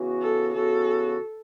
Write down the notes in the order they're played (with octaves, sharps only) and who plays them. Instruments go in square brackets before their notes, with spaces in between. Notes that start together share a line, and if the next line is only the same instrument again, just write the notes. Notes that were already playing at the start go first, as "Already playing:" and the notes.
Already playing: [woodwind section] C#3 E3 B3 F#4
[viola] A4
[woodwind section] C#3 E3 B3 F#4 [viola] A4